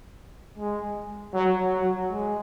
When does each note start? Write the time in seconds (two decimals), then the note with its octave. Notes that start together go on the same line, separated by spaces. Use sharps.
0.58 G#3
1.34 F#3
1.72 F#3
2.11 G#3